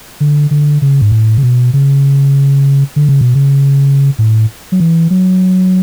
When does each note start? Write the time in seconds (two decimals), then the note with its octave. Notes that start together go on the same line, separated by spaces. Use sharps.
0.20 D3
0.51 D3
0.82 C#3
1.01 G#2
1.12 A2
1.37 C#3
1.43 B2
1.73 C#3
2.96 D3
3.09 C#3
3.21 B2
3.35 C#3
4.19 A2
4.72 F#3
4.80 E3
5.10 F#3